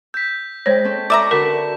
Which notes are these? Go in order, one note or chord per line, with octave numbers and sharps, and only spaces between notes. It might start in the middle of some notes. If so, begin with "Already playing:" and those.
E6 G6 B6
G#3 C5 C#5 G5
C4 C#4 A4
A4 D5 E5 A5 A#5 C#6
D3 F#4 A#4 B4 B6 E7